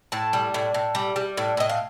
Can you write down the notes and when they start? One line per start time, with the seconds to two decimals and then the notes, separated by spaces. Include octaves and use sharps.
0.12 A2 A5
0.33 G3
0.54 A2
0.74 A2
0.95 G3
1.16 G3
1.37 A2
1.57 A2 D#5
1.69 F5